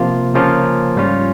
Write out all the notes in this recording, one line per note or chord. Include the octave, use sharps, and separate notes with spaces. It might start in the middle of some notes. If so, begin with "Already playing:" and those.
Already playing: C3 F3 A#3 F4
C#3 F3 A#3 C#4 F4
G#2 G3 C#4 F4